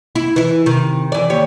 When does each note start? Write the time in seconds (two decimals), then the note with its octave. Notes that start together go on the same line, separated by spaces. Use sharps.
0.15 E4
0.36 E3 E4
0.66 C3 D#3
1.12 E3 D5
1.30 D#2 G4 C#5